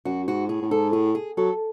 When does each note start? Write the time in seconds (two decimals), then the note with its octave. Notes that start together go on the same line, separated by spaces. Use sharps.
0.05 F#2 F#4
0.28 G#2 F#4
0.49 A2 G#4
0.62 A2
0.71 G#2 A4
0.93 A2 G#4
1.15 G#4
1.37 F#3 A4